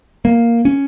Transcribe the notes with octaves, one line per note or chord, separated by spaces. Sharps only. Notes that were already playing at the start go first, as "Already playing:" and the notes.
A#3
C#4